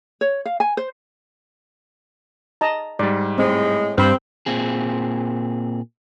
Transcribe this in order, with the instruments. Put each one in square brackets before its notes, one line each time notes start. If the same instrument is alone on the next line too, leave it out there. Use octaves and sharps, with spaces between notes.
[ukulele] C#5
F5
G#5
C5
[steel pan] D#5 A5 A#5
[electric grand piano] G#2 G3 [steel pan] D5
[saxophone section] A2 G#3 [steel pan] C4
[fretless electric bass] G2 [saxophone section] C4 [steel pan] C5 B5 [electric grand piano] F6
[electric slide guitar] A#2 C4 G#4